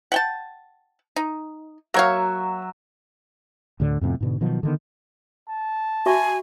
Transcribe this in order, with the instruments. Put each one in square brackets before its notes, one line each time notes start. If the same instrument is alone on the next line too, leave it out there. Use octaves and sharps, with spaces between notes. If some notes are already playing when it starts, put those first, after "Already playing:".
[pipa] F#5 G5 A5
D#4
[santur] F#3 F#4 E5 [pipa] A#3 C#5 F5
[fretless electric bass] D2 A2 D3
F2 A2 C3 B3
G#2 B2 D3
B2 D#3 F3 F#3
D3 D#3 B3
[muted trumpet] A5
[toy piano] F#4 E5 C#6 [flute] G#5